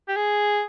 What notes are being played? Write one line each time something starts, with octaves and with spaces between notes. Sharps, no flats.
G4
G#4